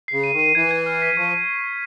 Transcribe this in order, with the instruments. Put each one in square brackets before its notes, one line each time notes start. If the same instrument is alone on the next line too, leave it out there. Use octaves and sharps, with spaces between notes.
[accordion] C#3 [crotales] C7
[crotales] D#7
[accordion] D#3
[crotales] D#7
[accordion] E3 [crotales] G#6
[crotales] G#6
F6
B6
[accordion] F3 [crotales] C#6